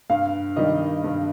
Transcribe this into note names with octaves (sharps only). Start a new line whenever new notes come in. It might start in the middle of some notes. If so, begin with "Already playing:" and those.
G2 F5
D#3 G3 D#5
G2